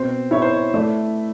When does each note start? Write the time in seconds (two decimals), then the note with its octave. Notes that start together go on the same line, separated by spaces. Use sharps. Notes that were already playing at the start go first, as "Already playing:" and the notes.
Already playing: B2 C4 C5
0.31 E4 C#5
0.42 C5
0.53 C#5
0.74 A3 D5